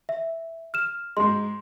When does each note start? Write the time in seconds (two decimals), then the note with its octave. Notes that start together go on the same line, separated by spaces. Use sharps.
0.09 E5
0.74 F6 E7
1.17 G#2 G#3 C6